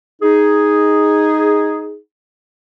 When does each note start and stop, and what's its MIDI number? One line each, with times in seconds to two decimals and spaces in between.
0.22 1.96 63
0.22 1.96 68